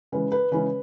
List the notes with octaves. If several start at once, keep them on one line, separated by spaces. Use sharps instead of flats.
C#3 E3 G#3 C#4 B4
B4
C#3 E3 G#3 C#4 B4